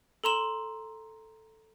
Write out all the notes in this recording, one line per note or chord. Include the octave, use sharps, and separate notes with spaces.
A4 A#5 C6 E7 F#7